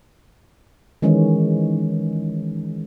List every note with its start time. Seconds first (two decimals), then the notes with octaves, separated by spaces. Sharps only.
1.02 D#3 E3 G#3 C#4